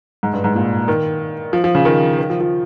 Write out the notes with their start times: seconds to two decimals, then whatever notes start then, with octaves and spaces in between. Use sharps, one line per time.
0.23 G#2
0.33 G2
0.44 G#2
0.55 A#2
0.88 D#3
1.53 F3
1.64 F3
1.75 C#3
1.85 D#3
2.19 D#3
2.30 F3
2.41 F3